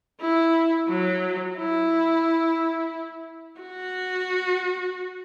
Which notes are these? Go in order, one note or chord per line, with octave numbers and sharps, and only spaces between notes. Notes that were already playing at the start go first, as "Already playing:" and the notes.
E4
F#3
E4
F#4